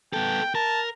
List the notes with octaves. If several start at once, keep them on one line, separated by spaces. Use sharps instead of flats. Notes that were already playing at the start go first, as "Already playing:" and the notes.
B3 A4 G5
A#4 A5